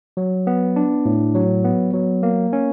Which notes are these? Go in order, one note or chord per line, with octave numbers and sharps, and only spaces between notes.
F#3
B3
D4
A2
F#3
B3
F#3
A#3
C#4